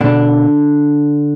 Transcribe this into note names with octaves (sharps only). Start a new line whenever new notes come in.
B2 D3 D4